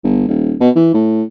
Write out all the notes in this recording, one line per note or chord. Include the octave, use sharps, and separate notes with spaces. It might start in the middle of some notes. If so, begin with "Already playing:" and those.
G1
D#1
B2
E3
A2